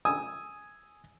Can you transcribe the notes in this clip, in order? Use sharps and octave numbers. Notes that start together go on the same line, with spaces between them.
G#5 D#6 E6